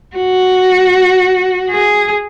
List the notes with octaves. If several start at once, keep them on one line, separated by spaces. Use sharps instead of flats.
F#4
G#4